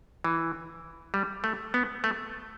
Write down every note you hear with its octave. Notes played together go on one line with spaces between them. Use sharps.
E3
G3
A3
B3
A3